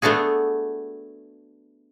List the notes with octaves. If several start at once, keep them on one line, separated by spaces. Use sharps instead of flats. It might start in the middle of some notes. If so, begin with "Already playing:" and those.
A3 B3 D4 F#4 G#4